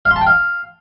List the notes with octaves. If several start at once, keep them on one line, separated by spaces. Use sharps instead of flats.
F5
C6
A5
G5
F5